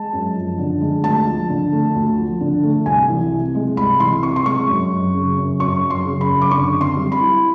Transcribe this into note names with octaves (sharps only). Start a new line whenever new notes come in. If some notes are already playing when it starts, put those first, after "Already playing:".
Already playing: G#3 A5
F#2
F3
D3
G#3
D2 A5
F3
D3
A3
D2
F3
D3
A3
C2 G#5
E3
C3
G#3
C2 B5
E3 C6
C3 C#6
C6
G#3 C#6
F#2
F#3
C#3
F#2
F#2 C#6
F#3
C6
C#3
B5
F#2
D6
D3 C#6
C4
C6
G3
B5
E4